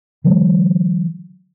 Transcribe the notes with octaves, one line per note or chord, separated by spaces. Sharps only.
D3 E3 F#3 G#3